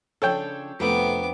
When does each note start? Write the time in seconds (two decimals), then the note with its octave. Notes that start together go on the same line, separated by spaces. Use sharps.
0.22 C#3 F3 D4 A4 C#5 G5
0.80 F2 C3 A3 B3 D4 A#4 E5 D6